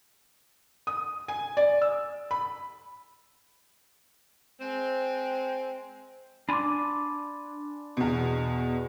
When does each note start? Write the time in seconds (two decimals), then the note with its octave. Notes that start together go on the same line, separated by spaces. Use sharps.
0.87 D#6
1.28 G#5
1.57 D5
1.82 E6
2.31 B5
4.61 G#3 C4
6.49 D4 D5 G#5 B5 C6 D6
7.97 E2 B2